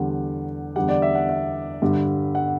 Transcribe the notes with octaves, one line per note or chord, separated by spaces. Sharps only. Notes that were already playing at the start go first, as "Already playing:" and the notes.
Already playing: E2 D3 G3 F#5
E2 D3 G3 F#5
D5
E5
F#5
E5
G2 D3 G3
F#5